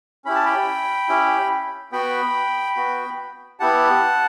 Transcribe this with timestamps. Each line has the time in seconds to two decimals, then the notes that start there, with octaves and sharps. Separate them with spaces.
0.25 C#4 E4 G4 B5
0.35 A5
0.46 G5 B5
1.09 C#4 E4 G4
1.92 B3 F#4 G5 B5
2.76 B3 F#4
3.60 B3 E4 G4 F#5 A5